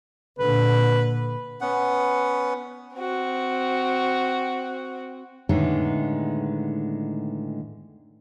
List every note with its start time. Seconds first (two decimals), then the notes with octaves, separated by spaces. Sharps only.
0.39 A#2 D3 B4
1.61 B3 C#4 F#5
2.94 C4 F#4
5.49 A2 D3 D#3 G#3 B3 D#4